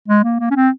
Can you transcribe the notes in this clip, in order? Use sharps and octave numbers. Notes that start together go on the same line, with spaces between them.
G#3
A#3
A#3
C#4
C4